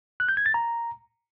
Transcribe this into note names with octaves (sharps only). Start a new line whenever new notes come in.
F#6
G6
G#6
A6
A#5